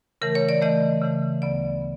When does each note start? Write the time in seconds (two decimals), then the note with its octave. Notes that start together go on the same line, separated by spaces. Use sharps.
0.21 C#3 E3 A3 A#4
0.35 C#5
0.49 D5
0.62 C#3 E3 A3 D#5
1.01 C#3 E3 A3
1.41 D2 C#3 F#3 B3 D5
1.81 B3